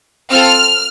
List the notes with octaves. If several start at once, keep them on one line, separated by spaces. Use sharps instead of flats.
C4 F4 A4 F6